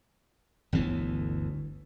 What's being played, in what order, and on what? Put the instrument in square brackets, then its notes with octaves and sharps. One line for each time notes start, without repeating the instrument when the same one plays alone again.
[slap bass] G1 D2 E3 B3